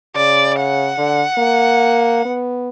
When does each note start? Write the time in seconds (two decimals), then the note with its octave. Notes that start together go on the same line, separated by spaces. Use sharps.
0.16 C#3 D5
0.61 F#5
0.98 D3
1.38 A#3
2.25 B3